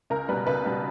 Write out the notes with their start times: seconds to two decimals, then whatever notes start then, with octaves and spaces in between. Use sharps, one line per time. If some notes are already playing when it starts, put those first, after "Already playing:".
0.10 C#2 A#4
0.28 B2 G3 B4
0.47 C#2 B4
0.65 B2 G3